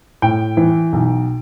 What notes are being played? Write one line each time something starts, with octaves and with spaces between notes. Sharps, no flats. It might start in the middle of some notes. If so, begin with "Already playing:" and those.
A2 G5
E3
B1